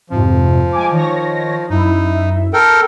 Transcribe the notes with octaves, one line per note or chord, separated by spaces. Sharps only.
F2 G#2 C3 F3
G#3 G#5 D6
D#3 C#5 A#6
F#2 D#4 E4 E5
A4 A#4 G5